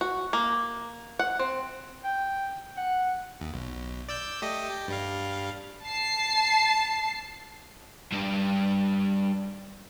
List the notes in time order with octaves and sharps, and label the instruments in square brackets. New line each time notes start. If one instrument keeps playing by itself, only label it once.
[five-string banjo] F#4
A#3
F#5
C4
[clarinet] G5
F#5
[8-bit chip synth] D#2
B1
D5 E6 G6
A3 G4 D#5
G4
G2 G3 F5
[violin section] A5 C7
[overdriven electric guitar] G2 D4